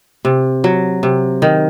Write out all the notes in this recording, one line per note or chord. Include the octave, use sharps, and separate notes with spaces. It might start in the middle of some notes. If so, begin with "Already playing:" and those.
C3
F#3
C3
D#3